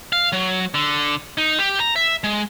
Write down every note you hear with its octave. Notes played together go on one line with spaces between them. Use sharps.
F5
F#3
D3
D#4
G4
A#5
E5
G#3